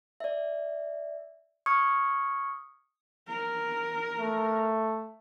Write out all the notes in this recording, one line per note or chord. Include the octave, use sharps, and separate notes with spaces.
D5 E5
C#6 D#6 F6 G#6 C#7
A#4
A3